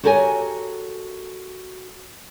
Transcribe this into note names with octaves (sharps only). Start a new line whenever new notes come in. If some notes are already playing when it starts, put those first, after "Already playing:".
F#4 G4 A4 A#4 C#5 G#5